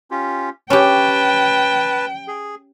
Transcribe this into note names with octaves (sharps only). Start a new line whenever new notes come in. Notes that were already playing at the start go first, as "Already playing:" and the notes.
C#4 F4 G4
C#4 G4 B4 G5 A5
G#4